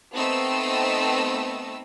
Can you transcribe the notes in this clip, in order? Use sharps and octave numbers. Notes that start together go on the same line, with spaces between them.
A3 B3 C4 D#4 D#5 E6